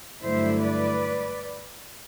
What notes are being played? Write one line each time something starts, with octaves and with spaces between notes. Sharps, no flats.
G2 D3 F#3 A3 E4 C5 E5
B4 D5